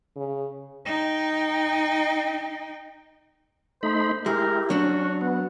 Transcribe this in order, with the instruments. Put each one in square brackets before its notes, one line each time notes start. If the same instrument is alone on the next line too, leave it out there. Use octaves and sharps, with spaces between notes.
[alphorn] C#3
[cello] D#4 G5
[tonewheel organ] A3 D#4 B5 [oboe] C5
[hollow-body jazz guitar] G#3 [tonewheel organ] E4 G4 [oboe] A#4
[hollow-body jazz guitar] F#3 D4 [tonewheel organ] C#4 [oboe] F#4
[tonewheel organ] B3 [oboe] F#5